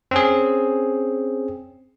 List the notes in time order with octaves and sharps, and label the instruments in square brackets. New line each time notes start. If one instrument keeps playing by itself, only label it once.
[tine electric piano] C4 C#4 G#4